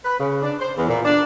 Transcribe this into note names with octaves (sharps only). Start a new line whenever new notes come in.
B4
C#3
D4
C5
E2
A#2
D4